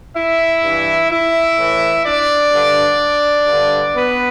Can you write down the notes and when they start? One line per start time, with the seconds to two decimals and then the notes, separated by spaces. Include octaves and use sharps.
0.14 E4 E5
0.62 G2 E3
1.10 E4 E5
1.58 A2 E3
2.04 D4 D5
2.52 G2 D3
3.47 G2 D3
3.95 B3 B4